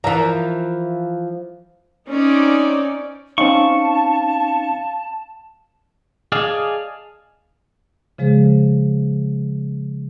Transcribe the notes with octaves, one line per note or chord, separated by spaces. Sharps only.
E3 F3 A#4 E5 A#5
C4 C#4 D#4 D5
C4 C#4 D#4 F5 A5 C#6
G#4 D5 D#5 F5 G#5 A5
C#3 F3 G#3 G#4 C5